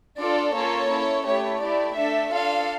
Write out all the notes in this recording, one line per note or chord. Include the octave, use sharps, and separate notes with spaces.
D4 F4 A4 D5
A#3 C#4 F4 A4 C#5
C#4 E4 A4
A3 E4 G4 C#5
A3 E4 G4 D5
A3 D4 A4 E5
D4 F4 A4 F5